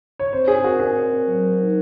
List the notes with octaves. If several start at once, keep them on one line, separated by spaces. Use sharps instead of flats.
C#5
C4 C5
G#4 C#5
F#4 A#4
C4 G#4
C#5
A#4
F#3
F#4
D#4